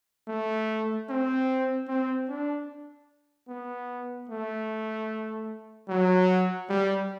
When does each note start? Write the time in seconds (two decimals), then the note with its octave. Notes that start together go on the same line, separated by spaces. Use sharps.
0.28 A3
1.09 C4
1.88 C4
2.28 D4
3.48 B3
4.29 A3
5.89 F#3
6.69 G3